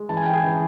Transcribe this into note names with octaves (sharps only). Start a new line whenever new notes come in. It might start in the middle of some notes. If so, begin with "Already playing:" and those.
Already playing: G#3
E3 A5
G#5
G5
G#4 G#5
E3